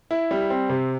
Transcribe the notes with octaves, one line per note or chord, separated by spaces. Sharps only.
E4
G3
C4
C3